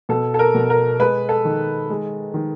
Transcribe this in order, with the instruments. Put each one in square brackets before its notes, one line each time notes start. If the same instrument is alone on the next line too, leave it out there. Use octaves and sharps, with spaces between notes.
[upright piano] B2 A4
A4
A#4
B2
A#4
G#3 B4
A4
D#3
G#3
D#3